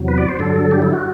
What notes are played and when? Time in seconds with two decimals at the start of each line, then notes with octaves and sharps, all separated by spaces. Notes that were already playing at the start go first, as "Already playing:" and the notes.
Already playing: E2 C3 F#3
0.08 B4
0.18 D5
0.29 C5
0.39 G2 D3 F#3 A4
0.71 G4
0.82 E4
0.93 F#4